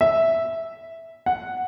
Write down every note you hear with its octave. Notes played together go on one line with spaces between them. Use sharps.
E5
F#5